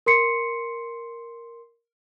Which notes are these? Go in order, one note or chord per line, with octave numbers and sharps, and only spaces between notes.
A#4 C6 C7 C#7